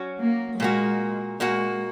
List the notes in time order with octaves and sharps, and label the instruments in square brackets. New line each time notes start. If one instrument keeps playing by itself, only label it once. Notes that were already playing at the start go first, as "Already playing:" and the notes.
Already playing: [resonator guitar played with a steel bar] F#3 C#4 F#4
[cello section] A#3
[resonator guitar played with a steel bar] A#2 A#3 F#4 [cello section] G#3
[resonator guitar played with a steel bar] A#2 A#3 F#4 [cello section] G#3